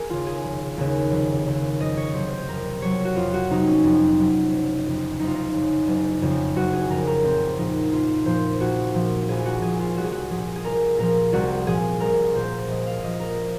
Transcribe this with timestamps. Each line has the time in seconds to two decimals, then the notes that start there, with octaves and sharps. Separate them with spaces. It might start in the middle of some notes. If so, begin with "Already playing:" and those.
Already playing: G#4 A#4
0.09 D#2 C#3 F4
0.27 G#4
0.44 F1
0.77 D#2 C#3
1.11 F1
1.46 D#2 C#3
1.80 F2 D#5
1.97 C#5
2.13 C3 F#3 C5
2.30 C5
2.48 F2 A#4
2.82 C3 F#3 C#5
3.05 F#4
3.16 F2 F4
3.33 F#4
3.50 C3 F#3 D#4
3.67 C#4
3.83 F2
4.17 C3 F#3
4.52 F#1
4.87 F2 C#3
5.20 F#1 D#4
5.27 F4
5.35 D#4
5.54 F2 C#3
5.88 F#1
6.22 F2 C#3
6.56 F#1 F#4
6.73 G#4
6.90 F2 C#3 A#4
7.07 A#4
7.24 A#1 C4
7.58 A#2 F3 D#4
7.92 A#1 F4
8.26 A#2 F3 C5
8.60 A#1 F#4
8.94 A#2 F3
9.29 A#1 G#4
9.45 F#4
9.62 A#2 F3 G#4
9.79 F4
9.97 C2 F#4
10.04 G#4
10.12 F#4
10.30 A#2 F3 G#4
10.56 G#4
10.64 C2 A#4
10.98 A#2 F3 A#4
11.33 C2 F#4
11.66 A#2 F3 G#4
12.00 C2 A#4
12.35 A#2 F3 C5
12.68 A#1 D#5
12.86 F5
13.02 A#2 F3 D#5
13.20 A#4